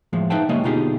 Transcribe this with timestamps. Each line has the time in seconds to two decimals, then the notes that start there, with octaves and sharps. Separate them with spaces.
0.13 A2 F3 G#3
0.30 D#4 B4 E5 F5 G5 A5
0.49 C#3 G3 G#3 A#3 C#5 D#5
0.64 B2 D3 D#4 F4 G4 G#4